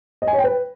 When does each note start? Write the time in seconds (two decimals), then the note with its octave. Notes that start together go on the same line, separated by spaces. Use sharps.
0.22 D#5
0.27 G#5
0.33 C#5
0.38 G5
0.44 B4